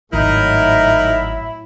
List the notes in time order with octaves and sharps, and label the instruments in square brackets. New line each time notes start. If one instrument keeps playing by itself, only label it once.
[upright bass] G#1 [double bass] A2 F#3 [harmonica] D#4 A#4 [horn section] E4